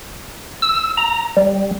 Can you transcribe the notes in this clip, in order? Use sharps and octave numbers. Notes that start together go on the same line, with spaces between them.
E6
A#5
G3